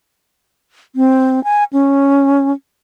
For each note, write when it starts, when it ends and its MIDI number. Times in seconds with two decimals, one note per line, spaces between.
0.96 1.43 60
1.44 1.64 80
1.73 2.52 61